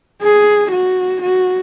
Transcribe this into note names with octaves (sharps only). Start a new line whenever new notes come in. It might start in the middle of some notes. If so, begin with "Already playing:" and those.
G#4
F#4
F#4